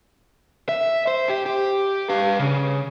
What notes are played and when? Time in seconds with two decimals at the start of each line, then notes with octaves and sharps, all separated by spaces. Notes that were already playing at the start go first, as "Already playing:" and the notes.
0.69 E5
1.07 C5
1.29 G4
1.46 G4
2.10 B4 F5
2.39 C#3